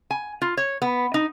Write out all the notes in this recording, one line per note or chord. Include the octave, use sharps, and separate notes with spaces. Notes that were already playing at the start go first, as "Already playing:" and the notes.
G#5
F4
C#5
B3
D#4